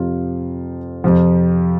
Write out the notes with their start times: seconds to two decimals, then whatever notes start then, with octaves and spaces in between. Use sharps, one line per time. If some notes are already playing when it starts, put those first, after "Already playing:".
Already playing: F2 C3 F3 C4 F4
1.04 F2 C3 F3